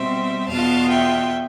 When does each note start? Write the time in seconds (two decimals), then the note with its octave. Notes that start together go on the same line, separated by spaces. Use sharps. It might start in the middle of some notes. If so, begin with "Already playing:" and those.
Already playing: B2 G3 C4 C5 E5
0.47 E2 B2 B3 F4 F5 A5
0.89 E5 G5